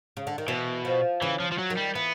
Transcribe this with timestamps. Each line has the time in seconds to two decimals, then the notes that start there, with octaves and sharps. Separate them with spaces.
0.17 C#3
0.27 D3
0.38 D#3
0.48 B2 E3
0.85 F3
1.22 C#3 E3
1.40 F3
1.52 F3
1.58 F#3
1.70 D#3
1.77 G3
1.95 E3 B3